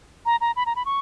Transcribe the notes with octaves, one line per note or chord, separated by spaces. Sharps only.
A#5
A#5
B5
A#5
B5
C#6